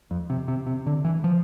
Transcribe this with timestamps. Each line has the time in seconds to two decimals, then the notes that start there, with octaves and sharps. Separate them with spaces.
0.11 F2
0.30 C3
0.48 C3
0.67 C3
0.86 D3
1.05 E3
1.24 F3